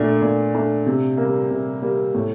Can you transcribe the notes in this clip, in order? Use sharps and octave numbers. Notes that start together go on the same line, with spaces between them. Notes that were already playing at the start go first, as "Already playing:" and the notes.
Already playing: A#2 A3 D4
A#2
A3 D4
C3
A#3
G3
C3
G3 A#3
A2